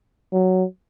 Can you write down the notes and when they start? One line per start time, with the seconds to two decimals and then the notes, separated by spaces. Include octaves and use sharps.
0.33 F#3